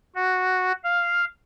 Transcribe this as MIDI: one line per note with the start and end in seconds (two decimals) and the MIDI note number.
0.15 0.72 66
0.84 1.25 77